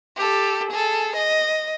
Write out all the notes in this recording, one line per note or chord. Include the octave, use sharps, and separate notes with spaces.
G4 A4
G#4 A4
D#5